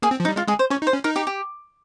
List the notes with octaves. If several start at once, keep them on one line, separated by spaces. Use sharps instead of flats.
A#3 G#4
C4
F3
D#4
G3
G#3 F4
G#3 G#4
C5
C#4 C#5
D#4
C5
C#4
D#4 A#4
G4
G4